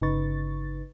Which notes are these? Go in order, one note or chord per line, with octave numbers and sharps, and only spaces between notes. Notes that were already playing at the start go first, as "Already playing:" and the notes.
G1 C#3 D#4 B4 C#6 A6